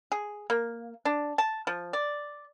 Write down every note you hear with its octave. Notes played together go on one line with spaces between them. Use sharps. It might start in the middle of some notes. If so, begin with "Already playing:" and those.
G#4
A#3
D4
A5
F3
D5